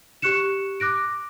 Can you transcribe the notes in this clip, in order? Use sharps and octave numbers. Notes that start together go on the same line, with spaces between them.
G4 C#6 F#6 C#7 E7
D6 F#6 A#6 D7